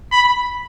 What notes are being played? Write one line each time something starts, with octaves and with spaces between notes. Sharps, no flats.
B5